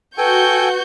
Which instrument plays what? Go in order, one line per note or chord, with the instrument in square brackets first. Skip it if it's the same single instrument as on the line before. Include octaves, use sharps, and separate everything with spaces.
[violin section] F#4 C#6 G6 [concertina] A4 G5 G#5 [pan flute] B4